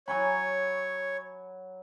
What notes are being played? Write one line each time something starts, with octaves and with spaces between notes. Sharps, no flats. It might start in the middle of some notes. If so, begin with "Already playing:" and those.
F#3 C#5 G#5 B5